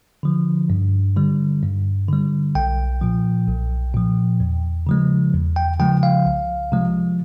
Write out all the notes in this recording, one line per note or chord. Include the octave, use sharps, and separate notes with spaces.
D3 F3
G2
D3 G3
G2
D3 G3
B1 G5
A#2 F3
B1
A#2 F3
E2
C#3 F3 G#3
E2
G5
C#3 F3 G#3 G5
F5
C2
C3 F3 G#3